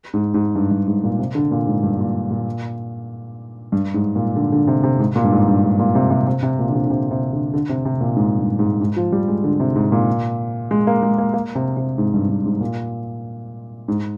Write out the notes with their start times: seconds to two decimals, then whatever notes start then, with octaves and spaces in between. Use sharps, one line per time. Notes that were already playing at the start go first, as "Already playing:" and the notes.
0.14 G#2
0.34 G#2
0.55 G2
0.71 G2
0.88 G#2
1.03 A#2
1.19 C3
1.35 D3
1.51 A#2
1.67 G#2
1.83 G2
1.99 A#2
2.30 A#2
3.72 G2
3.94 G#2
4.16 A#2
4.36 D3
4.52 D3
4.67 C3
4.83 C3
4.99 G#2
5.16 A#2
5.24 G2
5.32 G#2
5.48 G2
5.63 G#2
5.79 A#2
5.95 C3
6.10 C3
6.27 C3
6.43 C3
6.59 A#2
6.69 D3
6.75 C3
6.84 D3
6.90 C3
7.11 C3
7.33 D3
7.53 D3
7.69 C3
7.85 C3
8.01 A#2
8.16 G#2
8.39 G2
8.59 G#2
8.81 G#2
8.96 F3
9.12 G3
9.28 G#3
9.44 D3
9.60 C3
9.76 G#2
9.92 A#2
10.71 G#3
10.87 A#3
11.03 G#3
11.18 A#3
11.34 A#3
11.55 C3
11.77 C3
11.98 G#2
12.14 G2
12.29 G2
12.46 G#2
12.61 A#2
13.88 G#2